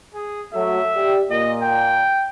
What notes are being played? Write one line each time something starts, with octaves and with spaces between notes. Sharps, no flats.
G#4
F#3 A3 E5
G4 D5
A#2 D#5
G5